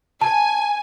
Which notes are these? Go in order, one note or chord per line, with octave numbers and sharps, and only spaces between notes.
G#5 A5